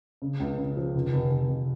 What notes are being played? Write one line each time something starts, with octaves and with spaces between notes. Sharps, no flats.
C#3
C#2
C#3
F3
F1
F1
F1
F1